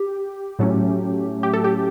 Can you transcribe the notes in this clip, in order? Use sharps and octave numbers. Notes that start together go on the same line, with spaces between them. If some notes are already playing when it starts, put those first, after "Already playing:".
Already playing: G4
A2 F#3 A3 C#4
G4
A4
G4